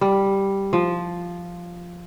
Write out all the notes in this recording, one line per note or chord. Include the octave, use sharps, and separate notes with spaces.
G3
F3